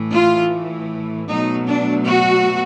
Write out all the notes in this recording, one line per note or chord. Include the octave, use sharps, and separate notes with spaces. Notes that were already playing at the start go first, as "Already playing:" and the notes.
Already playing: A2 E3 A3
F4
B2 F#3 A3 D#4
D4
F#4